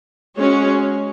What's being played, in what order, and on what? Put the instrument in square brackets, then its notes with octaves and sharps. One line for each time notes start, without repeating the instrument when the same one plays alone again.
[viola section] G#3 C#4 F#4 C#5